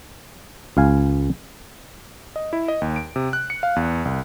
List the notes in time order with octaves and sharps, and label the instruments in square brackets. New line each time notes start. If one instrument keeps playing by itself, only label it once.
[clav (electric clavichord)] C#2 F5 G#5
[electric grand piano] D#5
E4
D#5
D#2
D7
C3
F#6
C#7
F5
E2
C2